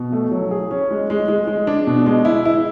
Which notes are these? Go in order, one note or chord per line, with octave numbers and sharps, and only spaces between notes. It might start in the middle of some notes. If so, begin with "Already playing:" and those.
Already playing: B2
A3
F#3
G#4
C#4
G#3
G#3
G#3
G#3
D4
B2
G#3
E4
E4